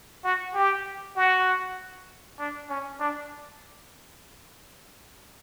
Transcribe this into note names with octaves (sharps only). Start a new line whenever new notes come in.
F#4
G4
F#4
D4
C#4
D4